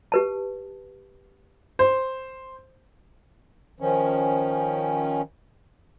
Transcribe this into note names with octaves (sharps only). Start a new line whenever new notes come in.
G4 B4 A5
C5
D#3 F3 C#4